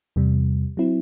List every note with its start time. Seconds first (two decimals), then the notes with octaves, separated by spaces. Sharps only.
0.16 E2 C3 G3
0.77 F#3 C4 E4